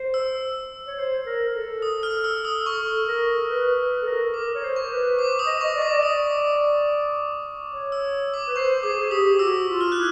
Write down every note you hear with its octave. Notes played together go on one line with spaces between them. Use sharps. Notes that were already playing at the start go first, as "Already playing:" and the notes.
Already playing: C5
E6
C#5
C5
A#4
A4
D#6
F6
E6
D#6
A4 C#6
A#4
B4
B4
A4
A#4
A#4 D6
C#5
C5
C#6
B4
C5 D6
D6
D#6
D#5
D#5 C#6
D5
D#5 D6
D5
D#6
C#5
E6
D6
B4
C5 C#6
G#4 D6
G#4
G4 D#6
F#4 E6
F4
F6
E4 F#6